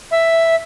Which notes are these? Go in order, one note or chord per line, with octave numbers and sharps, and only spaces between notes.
E5